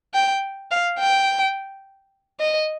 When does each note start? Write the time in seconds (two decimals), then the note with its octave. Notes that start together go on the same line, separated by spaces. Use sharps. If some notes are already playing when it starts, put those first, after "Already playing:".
0.14 G5
0.71 F5
0.99 G5
2.40 D#5